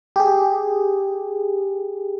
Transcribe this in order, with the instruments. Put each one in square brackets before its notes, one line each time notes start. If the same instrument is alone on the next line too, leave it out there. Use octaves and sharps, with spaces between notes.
[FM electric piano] G4 G#4